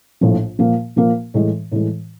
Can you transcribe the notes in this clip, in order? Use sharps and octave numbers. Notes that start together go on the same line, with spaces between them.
A#1 A2 F3
A#2 F3 A#3
A#2 F3 A#3
A2 E3 G#3
A2 E3 G#3